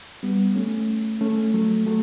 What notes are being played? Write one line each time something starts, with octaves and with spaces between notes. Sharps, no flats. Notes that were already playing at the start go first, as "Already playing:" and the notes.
G3 B3
A3 C#4
A3 C#4
F#3 A3
F#3 A3